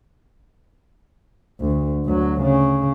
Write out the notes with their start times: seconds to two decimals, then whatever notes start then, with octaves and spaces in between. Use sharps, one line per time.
1.61 D2
2.05 D2 F#3
2.42 C#3